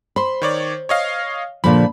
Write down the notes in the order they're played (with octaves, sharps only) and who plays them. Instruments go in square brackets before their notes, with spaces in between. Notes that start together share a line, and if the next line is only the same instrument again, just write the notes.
[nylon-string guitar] C5 [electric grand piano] B5 C6
[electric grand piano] D#3 C#5 D5
C#5 D#5 F5
[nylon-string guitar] A#2 D3 F3 [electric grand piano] B5